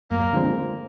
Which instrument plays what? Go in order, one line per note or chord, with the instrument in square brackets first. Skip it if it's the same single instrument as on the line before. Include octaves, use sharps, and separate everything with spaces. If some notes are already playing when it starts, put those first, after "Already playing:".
[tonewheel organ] F#2 [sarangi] A#3
[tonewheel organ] D3 F3 G#3 C4